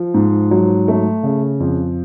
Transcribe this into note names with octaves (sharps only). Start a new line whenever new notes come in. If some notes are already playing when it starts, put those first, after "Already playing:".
Already playing: F3
G#2
F#3
A3
C#3
F2